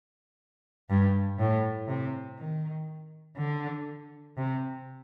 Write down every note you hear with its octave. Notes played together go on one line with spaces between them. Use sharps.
G2
A2
C3
D#3
D3
C3